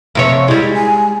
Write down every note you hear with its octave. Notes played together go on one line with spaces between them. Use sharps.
F2 C3 C#5
G3 G#3 E4
G#5